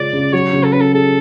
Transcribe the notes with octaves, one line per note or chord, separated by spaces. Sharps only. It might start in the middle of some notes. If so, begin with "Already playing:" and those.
Already playing: C#3 G#3 C#4 F4 D5
C#3
F#3 C#5
C#3
A4
C#4 B4
A4
G#4 A4